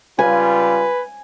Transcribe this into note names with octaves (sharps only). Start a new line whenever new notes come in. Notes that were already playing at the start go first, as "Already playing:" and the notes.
C#3 G3 F4 B4 G#5